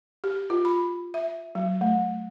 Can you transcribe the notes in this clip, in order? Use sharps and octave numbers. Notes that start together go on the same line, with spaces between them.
G4
F4
B5
E5
F#3
A3